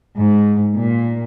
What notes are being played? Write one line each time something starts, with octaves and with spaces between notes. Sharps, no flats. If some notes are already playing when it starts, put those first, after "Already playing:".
G#2
A#2